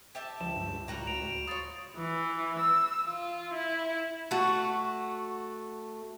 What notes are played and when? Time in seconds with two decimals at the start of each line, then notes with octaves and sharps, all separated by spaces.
0.15 G4 E5 A5
0.41 C#2 F3 E7
0.56 G2
0.88 A2 G3 F#4 A#5
1.07 D2 D7 F7
1.47 F4 C#5 D#6 A6
1.96 E3
2.58 E6
3.09 F4
3.55 E4
4.31 A3 F#4